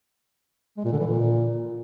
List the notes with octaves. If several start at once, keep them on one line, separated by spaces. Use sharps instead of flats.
G#3
A#2
D3
E3
A#2